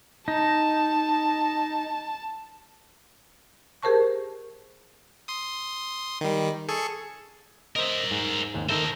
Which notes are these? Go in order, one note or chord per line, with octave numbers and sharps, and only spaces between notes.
D#4 A5
G4 G#4 A#4 C5 A5 C#6
C6 D#6
D#3 G3
G#4 A4 C#6
A#4 C5 D#5 E5
G#2
D#2 G#2
D#3 A4 A#4 C5 E5